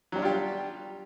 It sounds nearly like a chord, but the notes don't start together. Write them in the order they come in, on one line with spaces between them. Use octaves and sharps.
F#3 G3 D4 F4 G4